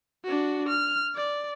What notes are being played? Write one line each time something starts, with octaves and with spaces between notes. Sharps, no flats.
D4 F#4
F6
D5